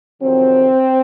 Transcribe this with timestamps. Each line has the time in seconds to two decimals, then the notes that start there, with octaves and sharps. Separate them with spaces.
0.21 F2 C3 D#3 F#3 C4